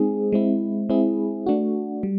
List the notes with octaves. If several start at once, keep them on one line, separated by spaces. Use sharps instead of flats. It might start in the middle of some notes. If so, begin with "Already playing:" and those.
Already playing: G#3 C4 D#4 G#4
G#3 C4 E4
G#3 C4 E4 G#4
A3 D4 F#4
G3